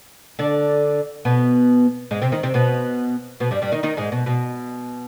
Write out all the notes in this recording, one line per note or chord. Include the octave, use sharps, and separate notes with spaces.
D3 D4
B2 B3
G#2 G#3
C3 C4
D#3 D#4
C3 C4
B2 B3
B2 B3
G2 G3
G2 G3
D#3 D#4
D#3 D#4
G#2 G#3
B2
B2